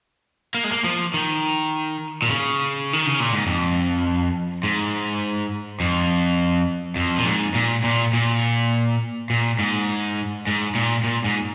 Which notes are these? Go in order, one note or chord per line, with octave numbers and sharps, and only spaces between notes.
A#3
G#3
A#3
F3
D#3
A#2
C#3
D#3
C#3
A#2
G#2
F2
G#2
F2
F2
A#2
G#2
A#2
A#2
A#2
A#2
G#2
G#2
A#2
A#2
G#2